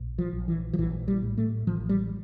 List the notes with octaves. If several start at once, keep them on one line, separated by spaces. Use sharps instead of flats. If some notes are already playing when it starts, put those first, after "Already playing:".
Already playing: A#1
F3
A#1
E3
F3
A#1 E3
G3
A2
A3
A1 F3
G3